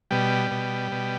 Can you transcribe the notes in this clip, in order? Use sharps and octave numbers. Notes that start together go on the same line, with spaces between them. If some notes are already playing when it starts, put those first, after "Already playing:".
B2 G3
B2
B2